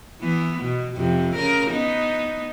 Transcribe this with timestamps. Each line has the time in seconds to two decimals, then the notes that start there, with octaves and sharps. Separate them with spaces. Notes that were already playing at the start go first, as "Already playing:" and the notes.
0.21 E3 B3
0.62 B2
0.96 F2 C3
1.35 C#3 A#4
1.71 B3 D#4